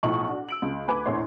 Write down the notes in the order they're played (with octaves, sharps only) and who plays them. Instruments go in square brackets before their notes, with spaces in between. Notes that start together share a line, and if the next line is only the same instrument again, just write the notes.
[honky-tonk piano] B1 A2 F3 D#4 C#6 F#7
D4 F#4
E6 D7 F#7
C#2
D2 B4 G#5 B5 D6
A#1 E2 A2 E3 C#5 C6